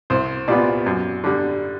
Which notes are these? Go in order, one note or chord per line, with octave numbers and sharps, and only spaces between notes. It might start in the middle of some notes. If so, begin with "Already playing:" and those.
C2 C5
A#2 G3 B3 D5
F#2
D3 G3